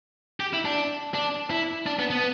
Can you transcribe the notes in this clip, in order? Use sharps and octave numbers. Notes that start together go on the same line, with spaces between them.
G4
E4
D4
D4
E4
D4
B3
B3